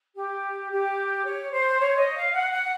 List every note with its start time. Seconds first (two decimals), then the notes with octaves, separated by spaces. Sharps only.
0.15 G4
0.70 G4
1.24 C#5
1.51 C5
1.79 C#5
1.97 D#5
2.15 F5
2.33 F#5
2.52 F#5